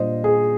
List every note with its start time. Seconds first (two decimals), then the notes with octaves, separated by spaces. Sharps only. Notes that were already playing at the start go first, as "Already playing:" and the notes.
Already playing: A#2 G3 D4 F4 C5 D#5
0.24 G#4